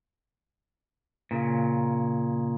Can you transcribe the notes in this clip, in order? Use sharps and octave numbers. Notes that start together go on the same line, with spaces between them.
A#2 C#3